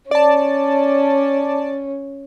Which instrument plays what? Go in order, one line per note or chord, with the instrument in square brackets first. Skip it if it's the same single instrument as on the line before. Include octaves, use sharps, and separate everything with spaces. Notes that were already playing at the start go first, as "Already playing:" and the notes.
[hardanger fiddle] C#4 [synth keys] D5 A5